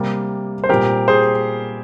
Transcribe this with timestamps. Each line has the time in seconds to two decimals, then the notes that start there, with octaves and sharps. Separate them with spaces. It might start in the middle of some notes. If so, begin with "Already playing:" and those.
Already playing: C3 G3 A#3
0.64 C5
0.69 A#2 G3 C4 G4 A#4
1.08 G#4 C5